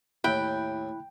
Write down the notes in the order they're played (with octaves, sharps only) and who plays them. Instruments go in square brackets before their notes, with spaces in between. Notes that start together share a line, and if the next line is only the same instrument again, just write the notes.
[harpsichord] D#2 A2 [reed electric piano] E4 B5 F#6 [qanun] G5